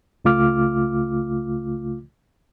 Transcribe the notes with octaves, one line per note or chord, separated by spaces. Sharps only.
C#2 C#3 A3 F4 D6 F6